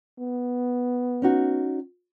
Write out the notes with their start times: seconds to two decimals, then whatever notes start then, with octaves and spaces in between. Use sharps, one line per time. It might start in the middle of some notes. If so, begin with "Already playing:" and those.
0.19 B3
1.22 C#4 D#4 F#4